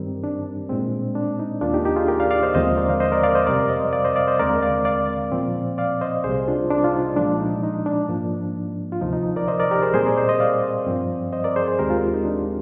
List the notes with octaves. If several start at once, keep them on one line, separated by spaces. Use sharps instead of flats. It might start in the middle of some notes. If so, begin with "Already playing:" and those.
Already playing: G2 D#3 G3 C4 G4 A#4
D4
A#2 G#3 C4
D4
D#4
D#2 D#3 A#3 D4 F4
D#4 G4
D#4 G4
F4 G#4
G4 A#4
D5 F5
D5 F5
C5 D#5
D#2 D3 F3 G#3 C4 C5 D#5
A#4 D5
F5
C5 D#5
A#4 D5
D5 F5
C5 D#5
F2 C3 G3 C4 A#4 D5
C5 D#5
D5 F5
C5 D#5
D5 F5
C5 D#5
D#2 D3 G#3 C4 A#4 D5
D5 F5
D5 F5
A#2 F3 C4
D5 F5
C5 D#5
C2 C3 G3 G#4 C5
D4 F4
D4
F4
D#4
A#2 F3 G#3 D4
D#4
D#4
D4
G#2 F3 A#3
F4
D2 C3 F3 D#4
D#4
A#4 D5
C5 D#5
A#4 D5
G4 A#4
G#4 C5
A#2 G3 C4 G#4 C5
A#4 D5
C5 D#5
C5 D#5
D5 F5
G2 F3 C4
C5 D#5
A#4 D5
G#4 C5
G#4 C5
D#2 D#3 G#3 C4 G4 A#4
F4 G#4
D#4
D4